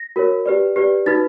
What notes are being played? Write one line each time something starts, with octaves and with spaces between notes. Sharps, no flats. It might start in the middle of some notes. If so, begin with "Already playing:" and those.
Already playing: A#6
F#4 A#4 C#5
G4 B4 D5
G4 B4 D5
D#4 F#4 B4 A6